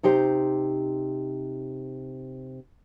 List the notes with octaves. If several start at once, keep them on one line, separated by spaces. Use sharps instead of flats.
C3 D#4 G4 C5